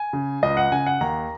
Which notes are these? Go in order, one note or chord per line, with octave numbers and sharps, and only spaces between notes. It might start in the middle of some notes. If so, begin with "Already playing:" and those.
Already playing: G#5
C#3
C#2 D#5
F#5
C#3 G#5
F#5
D#2 A#5